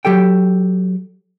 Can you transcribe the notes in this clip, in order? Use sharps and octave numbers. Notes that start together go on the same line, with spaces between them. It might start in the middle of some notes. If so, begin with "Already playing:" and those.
F#3 G4 A4 G5